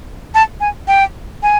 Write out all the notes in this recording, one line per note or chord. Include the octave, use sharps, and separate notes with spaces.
A5
G#5
G5
G#5